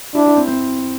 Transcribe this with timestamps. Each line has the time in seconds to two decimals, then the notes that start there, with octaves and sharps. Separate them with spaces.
0.15 D4 E4
0.26 E4
0.36 C4
0.47 C4